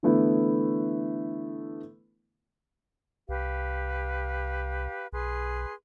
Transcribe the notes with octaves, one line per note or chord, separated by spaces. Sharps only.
D3 E3 A3 B3 E4
C2 G4 B4 F5
B1 G#4 B4 C6